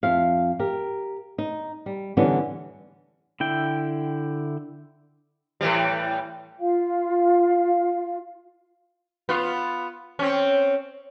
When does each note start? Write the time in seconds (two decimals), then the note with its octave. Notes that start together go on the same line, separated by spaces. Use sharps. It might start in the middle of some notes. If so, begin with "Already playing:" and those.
0.03 F2 E5 F5
0.59 G4 A#4
1.38 D#4
1.86 G3
2.17 D3 E3 G3 B3 C#4 D4
3.40 D3 E4 G5
5.61 A2 E3 G3
6.61 F4 F5
9.29 B3 F4
10.19 C4 C#4